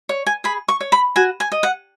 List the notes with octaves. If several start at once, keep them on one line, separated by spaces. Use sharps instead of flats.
C#5
G#5
G#4 B5
C#6
C#5
B5
F#4 G#5
G#5
D#5
F#5